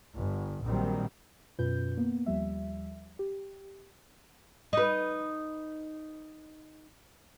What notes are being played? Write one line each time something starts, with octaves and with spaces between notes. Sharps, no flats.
G1
A#1 D#3 F#3 G3 C4
F#2 B2 C#4 F4 B4 G6
A#3 B3
D#2 F3 G3 E5
G4
D#4 B4